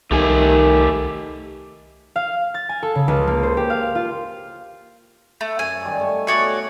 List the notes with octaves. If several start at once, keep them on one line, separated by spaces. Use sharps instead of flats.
C2 D#3 A3 G4 G#5
F5
A6
G#5
A4
C#3
C#2
A#3
C5
G4
F5
F4
A3
F#2 G#5
G2 D#3 G3
A3 C#6
B2 A3 D#4 F#4 C#5 D5